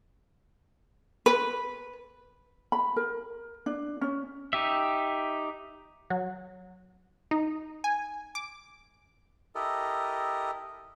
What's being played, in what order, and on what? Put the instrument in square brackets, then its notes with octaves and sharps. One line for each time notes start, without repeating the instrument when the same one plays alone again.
[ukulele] B4
B5
A#4
D4
C#4
[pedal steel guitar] D#4 G4 E5
[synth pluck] F#3
D#4
G#5
D6
[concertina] E4 G4 A4 A#4 D#5